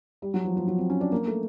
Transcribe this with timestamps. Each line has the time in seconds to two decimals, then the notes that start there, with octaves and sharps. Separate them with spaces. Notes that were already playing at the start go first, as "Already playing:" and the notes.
0.22 G3
0.34 F#3
0.45 F3
0.57 F3
0.67 F#3
0.78 C4
0.90 C#4
1.01 D4
1.12 A#3
1.27 A3